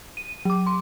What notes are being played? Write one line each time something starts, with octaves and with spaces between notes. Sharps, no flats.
D#7
F#3 D6
C6